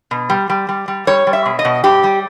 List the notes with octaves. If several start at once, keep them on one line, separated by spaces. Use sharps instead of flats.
B2
G3
G3
G3
G3
G3 C#5
G3
E5
B2
D#5
B2
G2 G4
G3